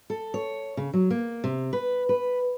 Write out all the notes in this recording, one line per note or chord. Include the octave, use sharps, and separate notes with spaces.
A4
C#5
C#3
F#3
A#3
C3
B4
B4